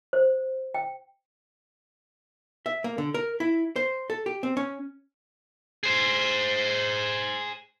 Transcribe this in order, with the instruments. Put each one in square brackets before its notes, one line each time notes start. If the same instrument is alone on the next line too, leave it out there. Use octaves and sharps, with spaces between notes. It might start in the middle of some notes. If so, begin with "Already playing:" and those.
[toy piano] C5
G5
[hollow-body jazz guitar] E5
A#3
D3
A#4
E4
C5
A4
G4
C4
C#4
[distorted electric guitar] G#4 C5